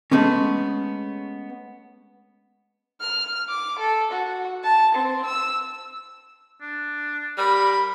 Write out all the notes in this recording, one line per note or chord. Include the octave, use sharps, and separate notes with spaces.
G#3 A3 B3 C#4
F6
D6
A4
F#4
A5
C4
E6
D4
G3 A#4 B5